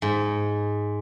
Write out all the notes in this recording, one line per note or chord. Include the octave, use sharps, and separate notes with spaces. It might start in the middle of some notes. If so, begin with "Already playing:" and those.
G#2